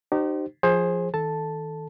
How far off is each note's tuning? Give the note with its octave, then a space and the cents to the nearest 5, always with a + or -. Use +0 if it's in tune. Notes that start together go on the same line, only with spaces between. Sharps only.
D#4 -35 G4 -35 C5 +0
F3 +0 G#4 +0 C5 +20
D#3 +25 A4 -5 A5 +0